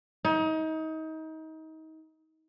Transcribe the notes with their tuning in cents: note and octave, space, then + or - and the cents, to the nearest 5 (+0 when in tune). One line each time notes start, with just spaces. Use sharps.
D#4 +30